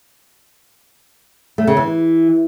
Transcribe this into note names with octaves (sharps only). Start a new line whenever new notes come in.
A3
C#3
E3